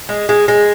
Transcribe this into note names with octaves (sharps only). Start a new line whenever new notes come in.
G#3
G#3
G#3